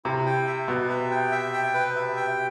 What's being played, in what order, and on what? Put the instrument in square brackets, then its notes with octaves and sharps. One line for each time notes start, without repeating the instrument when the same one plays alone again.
[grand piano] C3 [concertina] E4
[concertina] G5
E5
[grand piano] B2 [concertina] B4
[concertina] E5
G5
E5
G5
B4
E5
G5